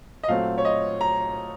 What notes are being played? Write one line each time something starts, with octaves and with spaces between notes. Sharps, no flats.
D#5
A#2 F#3 A3 C4 F5
C#5
D#5
A#5